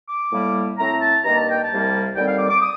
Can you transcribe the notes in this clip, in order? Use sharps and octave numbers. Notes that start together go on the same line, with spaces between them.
D6
A2 G3 A#3
A2 A3 C4 A#5
A5
G2 D#3 A#3 A#5
A5
G5
A5
C2 C3 G3 A#3
D#2 D3 G3 C4 G5
F5
D6
D6
D#6